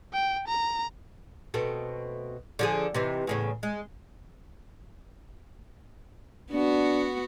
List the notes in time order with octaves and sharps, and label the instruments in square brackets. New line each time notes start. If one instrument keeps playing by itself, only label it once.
[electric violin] G5
A#5
[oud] B2 A3 C4
D3 F3 G#4
C3 E3 D#4
E2 A2 C#3
G#3
[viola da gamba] B3 F#4 [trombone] D4